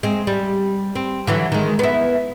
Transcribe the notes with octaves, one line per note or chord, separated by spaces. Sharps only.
G#3 C4
G3
C4
D3 E3 F#3
D#3 G#3
B3 E4